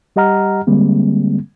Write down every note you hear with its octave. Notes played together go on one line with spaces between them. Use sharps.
G3 G4 D#5 F#5 A#5 F6
D3 G3 G#3 A#3 C4